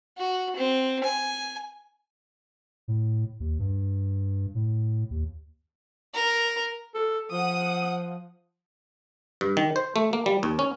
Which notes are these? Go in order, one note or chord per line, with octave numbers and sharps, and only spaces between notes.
F#4
C4
G#5
A2
D#2
G2
A2
D#2
A#4
A4
F3 F#5 D#6
G2
D#3
C5
A3
A#3
G3
D#2
C#4